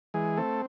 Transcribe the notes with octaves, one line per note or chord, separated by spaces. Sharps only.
E3 G#3 G#4
A3 C4 A4